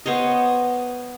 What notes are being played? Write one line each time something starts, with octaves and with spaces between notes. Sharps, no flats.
B3 C5 C#5 D#5